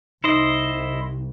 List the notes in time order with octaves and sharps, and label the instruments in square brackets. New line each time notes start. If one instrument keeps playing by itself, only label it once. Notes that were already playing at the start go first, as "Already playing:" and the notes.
[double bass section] C2 [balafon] D#4 [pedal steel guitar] E4 C5 D#5